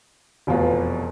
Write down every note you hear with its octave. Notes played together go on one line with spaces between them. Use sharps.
F1 E2 B2 B3 F4